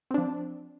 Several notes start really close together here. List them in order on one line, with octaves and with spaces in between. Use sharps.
C4 D4 F3